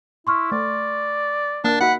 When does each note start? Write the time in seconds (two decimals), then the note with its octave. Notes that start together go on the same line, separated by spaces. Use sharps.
0.27 E4 C6 C#6 F6
0.52 A3 D5
1.64 A#3 D4
1.81 D#4 F#4 E5 F#5 B5